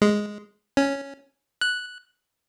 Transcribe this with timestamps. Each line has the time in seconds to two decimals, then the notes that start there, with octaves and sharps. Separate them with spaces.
0.02 G#3
0.77 C#4
1.61 F#6